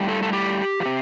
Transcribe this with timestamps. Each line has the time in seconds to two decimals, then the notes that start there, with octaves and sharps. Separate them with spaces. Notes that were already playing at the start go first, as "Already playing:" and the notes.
Already playing: A2 G3
0.09 A4
0.23 A4
0.33 G4
0.80 F3
0.85 C3